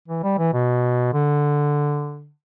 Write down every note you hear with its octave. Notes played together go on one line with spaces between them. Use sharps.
E3
G3
E3
B2
D3